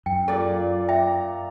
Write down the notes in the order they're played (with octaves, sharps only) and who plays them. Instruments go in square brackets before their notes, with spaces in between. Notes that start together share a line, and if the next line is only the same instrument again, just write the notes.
[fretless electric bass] F#2 [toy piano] G5
[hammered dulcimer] A#2 D5 [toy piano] G#4 A4
[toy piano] E5 G5 [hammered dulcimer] A#5